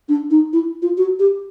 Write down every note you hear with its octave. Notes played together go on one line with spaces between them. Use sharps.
D4
D#4
E4
F4
F#4
G4